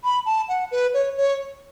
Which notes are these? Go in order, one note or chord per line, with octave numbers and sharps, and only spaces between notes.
B5
A5
F#5
B4
C#5
C#5